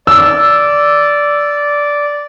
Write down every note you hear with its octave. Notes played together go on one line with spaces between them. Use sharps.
D5 E6